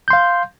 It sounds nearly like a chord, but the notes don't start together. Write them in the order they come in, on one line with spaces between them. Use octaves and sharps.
G6 C6 F5